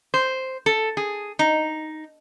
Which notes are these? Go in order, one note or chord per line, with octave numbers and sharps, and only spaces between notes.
C5
A4
G#4
D#4